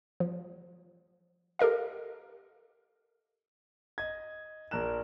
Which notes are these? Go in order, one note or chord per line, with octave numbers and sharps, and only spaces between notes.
F3
G4 A4 A#4 D#5 F5
D#5 G#6
A#1 A#4 F#6 E7